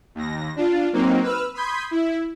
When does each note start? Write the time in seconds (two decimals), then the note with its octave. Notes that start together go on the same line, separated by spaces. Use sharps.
0.15 D#2 A#6
0.56 D4 F4
0.93 F#3 A#3 C4 D#4
1.22 B4 E6 F6
1.54 B5 C6 D#6 G6 G#6 B6
1.91 E4